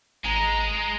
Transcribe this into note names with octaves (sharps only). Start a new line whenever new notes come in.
G#1 G#3 A#5 D#7 F7 G7